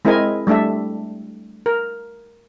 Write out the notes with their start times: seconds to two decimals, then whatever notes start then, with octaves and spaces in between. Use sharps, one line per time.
0.05 G#3 C4 E4 A#4 D#5 G#5
0.47 G3 A3 D4 A4 E5
1.66 A#4